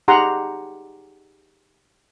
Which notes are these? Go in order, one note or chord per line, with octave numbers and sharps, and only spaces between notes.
D#4 G4 G#4 F#5 A#5 C6